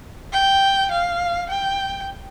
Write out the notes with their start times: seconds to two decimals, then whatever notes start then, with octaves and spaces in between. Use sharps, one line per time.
0.33 G5
0.91 F5
1.50 G5